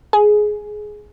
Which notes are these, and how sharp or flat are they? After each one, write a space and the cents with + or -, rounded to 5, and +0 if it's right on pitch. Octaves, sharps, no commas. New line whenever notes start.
G#4 +15